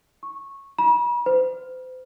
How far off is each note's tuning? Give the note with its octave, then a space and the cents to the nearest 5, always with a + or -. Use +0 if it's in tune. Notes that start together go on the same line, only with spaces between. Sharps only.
C#6 -15
B5 -40
C5 -40